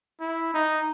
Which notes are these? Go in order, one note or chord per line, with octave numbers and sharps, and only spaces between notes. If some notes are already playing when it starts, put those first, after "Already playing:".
E4
D#4